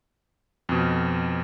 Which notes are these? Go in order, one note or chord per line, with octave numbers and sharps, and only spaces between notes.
F2 B2